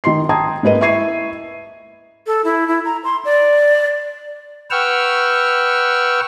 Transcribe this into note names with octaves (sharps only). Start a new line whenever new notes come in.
D#3 D#5 C6 C7
G5 A5 A#5 D#6 G#6
G#2 A#3 B4 D#5 D#7
E4 E5 C#6 G#6 C7 D#7
A4
E4
E4
A#5
C6
D5
B4 F#5 G5 C#6 E6 F6